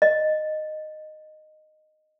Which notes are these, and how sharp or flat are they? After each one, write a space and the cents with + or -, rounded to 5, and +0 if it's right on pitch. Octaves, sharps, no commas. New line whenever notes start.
D#5 -10